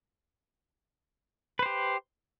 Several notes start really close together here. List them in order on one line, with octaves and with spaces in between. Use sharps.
B4 C5 G4